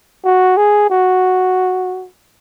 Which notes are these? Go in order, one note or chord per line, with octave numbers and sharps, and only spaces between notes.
F#4
G#4
F#4